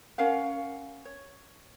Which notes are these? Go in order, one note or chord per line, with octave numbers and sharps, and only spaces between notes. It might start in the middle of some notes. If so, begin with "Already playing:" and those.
C#4 A#4 F5 F#5
C#5